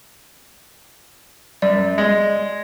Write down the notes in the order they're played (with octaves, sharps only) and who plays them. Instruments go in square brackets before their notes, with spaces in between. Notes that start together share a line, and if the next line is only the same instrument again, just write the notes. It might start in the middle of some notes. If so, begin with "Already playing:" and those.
[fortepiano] F#2 [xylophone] D5
[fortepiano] G#3